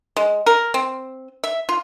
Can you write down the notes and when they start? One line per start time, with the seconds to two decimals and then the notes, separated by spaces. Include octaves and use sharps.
0.16 G#3
0.46 A#4
0.74 C4
1.44 E5
1.69 F4